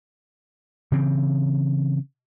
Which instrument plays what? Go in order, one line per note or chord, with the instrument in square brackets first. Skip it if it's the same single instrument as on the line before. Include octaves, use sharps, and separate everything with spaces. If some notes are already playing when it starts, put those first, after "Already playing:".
[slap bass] C#3 E3 C4